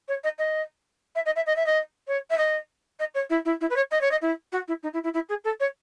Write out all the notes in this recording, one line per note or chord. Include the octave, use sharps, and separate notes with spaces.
C#5
D#5
D#5
E5
D#5
E5
D#5
E5
D#5
C#5
E5
D#5
D#5
C#5
E4
E4
E4
B4
C#5
D#5
C#5
D#5
E4
F#4
E4
D#4
E4
E4
E4
G#4
A4
C#5